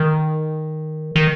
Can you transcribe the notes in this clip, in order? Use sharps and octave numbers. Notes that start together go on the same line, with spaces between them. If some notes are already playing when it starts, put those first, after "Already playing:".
Already playing: D#3
D#3